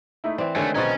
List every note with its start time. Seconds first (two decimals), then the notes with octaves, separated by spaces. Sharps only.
0.24 A3 D#4 E4
0.38 E3 C4 D5
0.56 D2 D3 D#3 G#3 A3 C#5 G#5
0.75 B1 B2 C#4 C5 D#5 A#5 A6